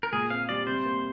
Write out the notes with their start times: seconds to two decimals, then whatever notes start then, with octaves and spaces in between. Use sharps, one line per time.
0.03 A#4
0.13 A#2 G#4
0.30 C4 F5
0.49 G3 D5
0.67 C3 C5
0.85 A#3